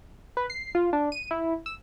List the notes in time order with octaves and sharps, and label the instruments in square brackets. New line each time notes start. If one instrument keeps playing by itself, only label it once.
[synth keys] B4
C7
F4
D4
D#7
E4
E6